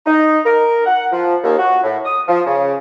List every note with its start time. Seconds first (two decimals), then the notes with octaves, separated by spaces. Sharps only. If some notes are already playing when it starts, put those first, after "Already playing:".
0.06 D#4
0.45 A#4
0.86 F#5
1.12 F3
1.43 D#2
1.58 F#4
1.83 A2
2.05 D#6
2.28 F3
2.46 C#3